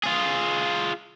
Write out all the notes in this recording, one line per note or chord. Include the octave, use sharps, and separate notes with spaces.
F4 G#4